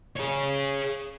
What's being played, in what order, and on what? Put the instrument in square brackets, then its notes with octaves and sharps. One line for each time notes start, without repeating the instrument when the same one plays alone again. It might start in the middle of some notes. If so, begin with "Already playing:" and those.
[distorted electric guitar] G#4 C#5